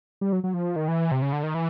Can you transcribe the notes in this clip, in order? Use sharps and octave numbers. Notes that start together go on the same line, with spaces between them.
G3
F#3
F#3
F3
D#3
E3
C3
C#3
D3
D#3
E3